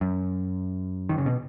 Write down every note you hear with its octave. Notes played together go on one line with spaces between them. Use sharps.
F#2
D#3
C#3
B2